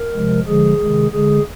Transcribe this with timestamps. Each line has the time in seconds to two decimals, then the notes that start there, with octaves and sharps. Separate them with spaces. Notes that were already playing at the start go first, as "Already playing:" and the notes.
Already playing: A#4
0.14 C3 F3 G#3
0.46 D3 F3 G#3 G#4
0.80 C3 D#3 G#3
1.13 D3 G#3 G#4